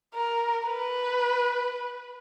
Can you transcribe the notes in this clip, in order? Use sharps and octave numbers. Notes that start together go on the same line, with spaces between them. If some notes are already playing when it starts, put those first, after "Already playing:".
A#4
B4